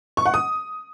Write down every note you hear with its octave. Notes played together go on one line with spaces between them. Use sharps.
C#6
F#5
D#6